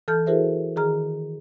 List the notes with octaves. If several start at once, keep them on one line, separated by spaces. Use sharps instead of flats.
E3 A4 A5 F6 G6
E4 F#4 G#4 A#4 C5 E5
D#3 G#4 A#5 F6